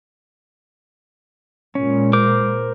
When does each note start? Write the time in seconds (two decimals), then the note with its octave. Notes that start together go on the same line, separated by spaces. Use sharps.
1.75 A#2 G#3 C#4
2.13 A#4 C5 D6